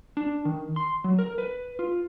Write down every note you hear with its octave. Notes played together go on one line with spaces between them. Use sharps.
D4
D#3
C6
F#3
A#4
B4
F4